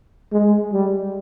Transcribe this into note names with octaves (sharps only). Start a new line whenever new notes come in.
G#3
G3